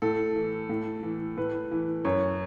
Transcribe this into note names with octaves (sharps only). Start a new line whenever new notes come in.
A2 A4
E3
A2
E3
A2 B4
E3
F#2 C#5